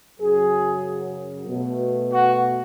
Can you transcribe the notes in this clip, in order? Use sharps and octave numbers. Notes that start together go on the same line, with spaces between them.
F#2 C#3 F#3 G#4
B2 A3
F#4